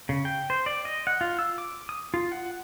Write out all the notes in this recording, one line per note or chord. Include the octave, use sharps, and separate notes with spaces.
C#3
G5
C5
D5
D#5
F#5
F4
E6
D6
D#6
F4
F#5